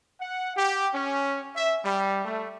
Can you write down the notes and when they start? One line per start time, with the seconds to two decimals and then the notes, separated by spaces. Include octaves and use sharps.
0.19 F#5
0.55 G4
0.93 C#4
1.54 E5
1.84 G3
2.24 A3